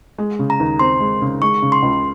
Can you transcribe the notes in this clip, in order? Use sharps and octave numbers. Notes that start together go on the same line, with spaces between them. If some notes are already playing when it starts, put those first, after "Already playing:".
G#3
C#3
A#5
D#2
C4 C6
G#3
C#3
G#3 C#6
C#3
C6
C#2